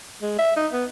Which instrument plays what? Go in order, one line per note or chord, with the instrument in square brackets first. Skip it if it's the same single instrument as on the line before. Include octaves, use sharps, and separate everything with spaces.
[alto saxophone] G#3
E5
D#4
B3